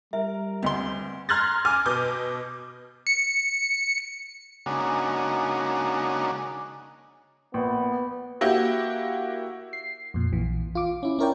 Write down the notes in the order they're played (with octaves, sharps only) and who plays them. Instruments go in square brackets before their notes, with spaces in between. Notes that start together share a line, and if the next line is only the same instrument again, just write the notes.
[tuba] G3 [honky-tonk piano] A#4 [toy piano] E5
[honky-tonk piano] D2 C4 [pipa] B3 C6
[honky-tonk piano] A#5 C6 F6 F#6 G#6 A6
G#5 D6 F6
B2 D6 G6
[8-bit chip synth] C#7
[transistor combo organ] C#3 G#3 A#3 D4 D#4 F#4
[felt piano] A#1 [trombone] B3
[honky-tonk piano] A#3 E4 F#4 G4
[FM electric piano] C7
F2 A#2
A#1 E3
F4 D6
C#4 E4
C#4 E4 A#4 C#5 D5 G5